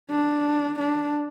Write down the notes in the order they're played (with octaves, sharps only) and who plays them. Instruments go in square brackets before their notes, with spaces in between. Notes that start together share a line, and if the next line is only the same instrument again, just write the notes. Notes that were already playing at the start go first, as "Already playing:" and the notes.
[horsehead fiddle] D4
D4